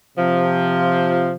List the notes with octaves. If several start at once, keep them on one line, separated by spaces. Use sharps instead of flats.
C3 F3